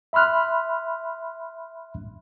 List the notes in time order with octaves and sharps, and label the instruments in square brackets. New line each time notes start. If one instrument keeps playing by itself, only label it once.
[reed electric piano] E5 B5 C6 F6 F#6